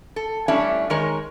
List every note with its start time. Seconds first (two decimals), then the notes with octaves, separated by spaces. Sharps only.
0.16 A4
0.48 G3 A3 C#4 D4 E4
0.90 D#3 G#3 A#4 C#5